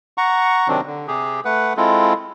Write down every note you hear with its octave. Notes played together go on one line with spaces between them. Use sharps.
F#5 A#5 C#6
C3 D#3 F#3 C4 D4
D3
C3 G4 G#4
A3 B4 F#5
G#3 C4 E4 F4 A4